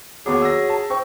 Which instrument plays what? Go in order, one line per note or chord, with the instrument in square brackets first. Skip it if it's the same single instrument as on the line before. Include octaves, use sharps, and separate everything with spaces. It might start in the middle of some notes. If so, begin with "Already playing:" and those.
[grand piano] D#2 B3 D6 [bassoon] F#3 [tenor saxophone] G#4
[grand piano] E6 A#6
A5
[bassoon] C4 [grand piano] C#6